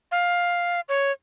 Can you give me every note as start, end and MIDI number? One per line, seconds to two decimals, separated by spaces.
0.12 0.80 77
0.89 1.12 73